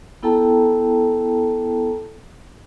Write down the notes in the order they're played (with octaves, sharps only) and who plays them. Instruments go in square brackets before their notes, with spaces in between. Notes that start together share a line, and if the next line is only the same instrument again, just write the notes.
[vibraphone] B3 E4 A4 G5 A5 A#5